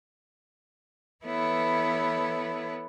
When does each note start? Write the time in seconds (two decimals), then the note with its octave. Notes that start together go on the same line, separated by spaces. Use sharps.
1.24 E3 B3 E4 A4 B4 C#5